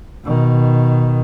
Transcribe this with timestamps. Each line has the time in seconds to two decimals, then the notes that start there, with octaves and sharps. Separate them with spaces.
0.24 B2 D#3